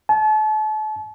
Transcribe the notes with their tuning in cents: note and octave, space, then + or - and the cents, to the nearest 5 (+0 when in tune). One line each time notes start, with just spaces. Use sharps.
A5 -35